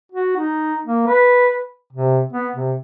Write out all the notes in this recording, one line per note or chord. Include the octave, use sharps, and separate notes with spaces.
F#4
D#4
A#3
B4
C3
B3
C3